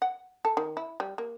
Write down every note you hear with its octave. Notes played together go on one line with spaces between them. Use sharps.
F#5
A4
D#3
E4
G3
A#3